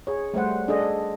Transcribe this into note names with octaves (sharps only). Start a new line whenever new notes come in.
G#4 C#5
G3 A3 C5 F#5
D4 G#4 A4 D#5